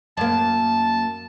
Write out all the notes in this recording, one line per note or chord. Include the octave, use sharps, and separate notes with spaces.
F#2 A#3 A5